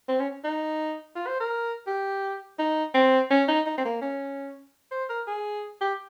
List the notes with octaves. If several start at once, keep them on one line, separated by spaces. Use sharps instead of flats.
C4
C#4
D#4
F4
C5
A#4
G4
D#4
C4
C#4
D#4
D#4
C4
A#3
C#4
C5
A#4
G#4
G4